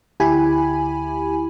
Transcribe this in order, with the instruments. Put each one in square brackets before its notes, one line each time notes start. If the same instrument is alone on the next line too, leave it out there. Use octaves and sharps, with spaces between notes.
[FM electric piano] D2 E4 G4 G#5 B5